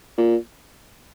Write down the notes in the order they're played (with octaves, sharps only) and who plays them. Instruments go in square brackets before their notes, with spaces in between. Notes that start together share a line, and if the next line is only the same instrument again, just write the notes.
[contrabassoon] A#2